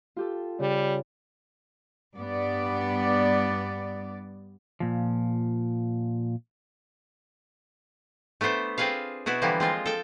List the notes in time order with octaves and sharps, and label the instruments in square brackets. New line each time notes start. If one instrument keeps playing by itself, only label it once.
[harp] F4 G4 A4
[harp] C#3 [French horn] G3
[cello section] G2 B3 D5
[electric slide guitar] A#2 F3
[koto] A3 B3 D4 C5 E5
C4 F4 G#4 B4 F5
B2 B3 E4 F#4
D3 E3 F3 G3 A#3 B3
G#3 C4 F4
A4 G5